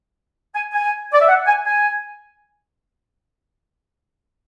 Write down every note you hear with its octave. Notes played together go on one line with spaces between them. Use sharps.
G#5
G#5
D5
E5
F#5
G#5
G#5